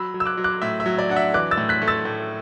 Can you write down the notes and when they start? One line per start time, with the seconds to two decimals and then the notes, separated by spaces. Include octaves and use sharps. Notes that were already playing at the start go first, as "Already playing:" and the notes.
Already playing: F#3 B5 E6
0.14 F#3
0.20 E6
0.26 D6 F#6
0.37 F#3
0.44 D6 F#6
0.62 A2 E5
0.80 E5
0.86 F#3
0.98 D5
1.09 D4 F#5
1.16 E5
1.34 E3 D6 F#6
1.51 E6 A6
1.58 A2
1.69 F#6 B6
1.82 A3
1.88 E6 A6
2.05 A2